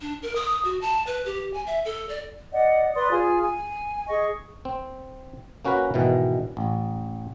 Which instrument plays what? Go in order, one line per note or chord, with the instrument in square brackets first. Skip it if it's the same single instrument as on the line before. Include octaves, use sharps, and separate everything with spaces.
[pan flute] D4
A#4
D#6
F#4
A5
B4
G4
G#5
E5
A4
D5
[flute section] D5 D#5 F#5
B4 D5 C6 D#6
F4 G#4 G#5
G#5
G#4 D#5 C#6
[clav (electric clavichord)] C4
A#3 C#4 F#4 A#4 B4
G#2 B2 D#3 E3
A1